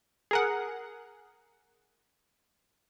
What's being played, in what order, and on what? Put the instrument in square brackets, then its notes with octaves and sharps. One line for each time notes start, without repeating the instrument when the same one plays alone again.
[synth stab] G#4 A#4 F#5